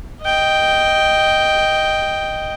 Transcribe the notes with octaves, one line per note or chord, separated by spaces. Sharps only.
D#5 G5